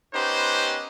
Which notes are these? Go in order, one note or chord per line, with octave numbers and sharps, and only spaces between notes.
B3 C#4 D#4 G4 B4 C5